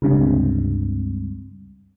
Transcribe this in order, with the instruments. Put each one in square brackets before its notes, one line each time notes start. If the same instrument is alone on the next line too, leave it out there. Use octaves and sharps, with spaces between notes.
[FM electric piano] C#2 G2 C3